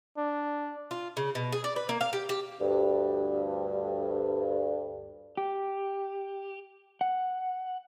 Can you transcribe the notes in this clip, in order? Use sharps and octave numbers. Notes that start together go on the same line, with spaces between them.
D4
F4
C#3
B2
G#4
D5
B4
A#3
F5
G4
G4
D2 G2
G4
F#5